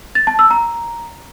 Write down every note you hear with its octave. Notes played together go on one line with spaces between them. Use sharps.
A6
A5
E6
A#5